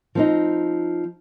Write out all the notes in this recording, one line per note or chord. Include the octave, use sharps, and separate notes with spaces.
F3 C4 D#4